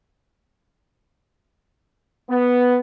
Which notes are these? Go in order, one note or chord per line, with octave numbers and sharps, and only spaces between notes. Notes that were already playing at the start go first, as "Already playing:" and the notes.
B3